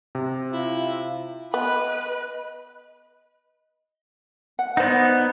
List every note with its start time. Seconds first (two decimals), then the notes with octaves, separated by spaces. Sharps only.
0.15 C3
0.52 E4 F4
1.54 B3 B4 D#5
4.59 F#5
4.77 B3 D#4 C5 D5 F#5